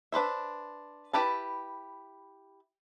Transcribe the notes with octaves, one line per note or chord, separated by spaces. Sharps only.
D4 B4 C5 E5
E4 G4 B4 A5